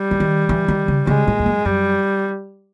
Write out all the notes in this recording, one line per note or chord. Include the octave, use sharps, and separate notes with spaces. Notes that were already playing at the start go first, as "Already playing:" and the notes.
Already playing: G3
E3
D#3
E3
D#3
C#3
C#3 G#3
A#2
F2
F#2
F#2 G3